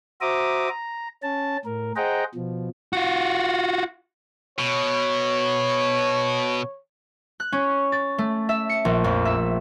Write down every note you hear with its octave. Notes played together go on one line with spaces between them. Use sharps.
F#4 C5 E5 A#5 D6 D#6
A#5
C#4 A5
A2 A#4
G#4 C5 D#5 F#5 G5 A#5
B2 F3
F4 F#4
B2 C#5
F#6
C#4
A6
A3
E5
C#7
A#1
F2
E5